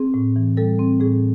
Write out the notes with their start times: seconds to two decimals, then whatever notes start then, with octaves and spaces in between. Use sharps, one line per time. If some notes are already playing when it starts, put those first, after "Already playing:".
Already playing: C4 G#4
0.14 A2
0.36 E3
0.57 G3 A4
0.79 C4
1.00 A2 G#4